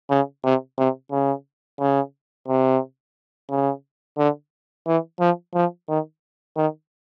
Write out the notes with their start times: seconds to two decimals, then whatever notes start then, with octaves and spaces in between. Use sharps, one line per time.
0.10 C#3
0.44 C3
0.78 C3
1.12 C#3
1.80 C#3
2.48 C3
3.50 C#3
4.18 D3
4.87 E3
5.20 F3
5.54 F3
5.88 D#3
6.56 D#3